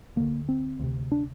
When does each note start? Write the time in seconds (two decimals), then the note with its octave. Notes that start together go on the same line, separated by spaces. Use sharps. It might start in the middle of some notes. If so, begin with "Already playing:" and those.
0.16 D2 D3 A#3
0.49 C4
0.80 D2 C3
1.12 D4